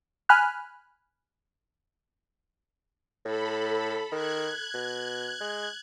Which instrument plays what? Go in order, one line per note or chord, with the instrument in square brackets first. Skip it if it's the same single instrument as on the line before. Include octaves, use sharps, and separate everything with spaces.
[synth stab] G#5 B5 F6 F#6
[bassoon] A2 [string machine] A4 B5
[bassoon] D#3 [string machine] F#6 G#6
[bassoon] B2
G#3